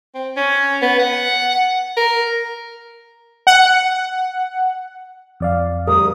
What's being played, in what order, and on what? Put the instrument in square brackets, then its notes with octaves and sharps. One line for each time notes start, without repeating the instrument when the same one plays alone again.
[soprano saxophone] C4
C#4
B3
F#5
A#4
[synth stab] F#5
[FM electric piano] F2 D5 F5
[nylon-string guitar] D2 G3 A#4 [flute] D#6